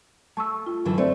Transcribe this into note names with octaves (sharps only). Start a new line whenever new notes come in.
A3 A5 C#6 E6
F4
F#2 D3 E3
A3 C4 C5 D5